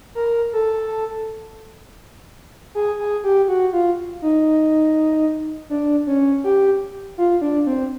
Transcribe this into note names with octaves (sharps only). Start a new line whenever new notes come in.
A#4
A4
G#4
G#4
G4
F#4
F4
D#4
D4
C#4
G4
F4
D4
C4